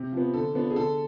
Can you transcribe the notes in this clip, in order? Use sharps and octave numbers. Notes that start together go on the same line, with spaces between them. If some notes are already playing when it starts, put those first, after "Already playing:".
Already playing: C3
F3 B3
D3 A4
F3 B3 D4
G#4
D3 A4